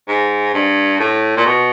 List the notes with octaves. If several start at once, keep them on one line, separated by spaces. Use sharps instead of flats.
G#2
G2
A2
A#2
B2